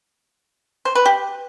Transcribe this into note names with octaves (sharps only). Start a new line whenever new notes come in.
C5
B4
G4